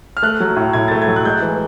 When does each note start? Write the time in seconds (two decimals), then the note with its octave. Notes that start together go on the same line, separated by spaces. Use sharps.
0.17 F6
0.23 A3 F#6
0.40 F#3
0.56 A2
0.73 A2 G#6
0.88 A3 A6
1.02 G#6
1.08 F#3
1.16 F#6
1.25 G#3 G6
1.42 E3